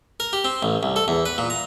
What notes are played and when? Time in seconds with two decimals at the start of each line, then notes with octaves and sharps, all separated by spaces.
0.20 A#4
0.33 G4
0.45 C4
0.63 A1
0.83 C2
0.96 A4
1.08 E2
1.26 B4
1.38 A#2
1.50 A#5